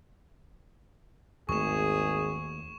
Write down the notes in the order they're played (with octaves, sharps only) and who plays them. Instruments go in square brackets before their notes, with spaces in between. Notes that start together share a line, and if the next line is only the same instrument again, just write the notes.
[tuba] G#1 [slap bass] D#2 A3 [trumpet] G#4 [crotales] C#6 E7